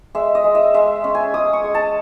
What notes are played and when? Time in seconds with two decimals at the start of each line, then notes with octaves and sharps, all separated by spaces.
0.15 G#3 E5
0.35 D#5
0.44 G#3
0.55 E5
0.74 G#3 E5
1.04 C#4
1.15 G#5
1.34 G#3 D#6
1.53 C#6
1.64 G#3
1.74 A5